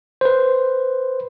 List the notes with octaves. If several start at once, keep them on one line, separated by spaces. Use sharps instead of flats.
B4 C5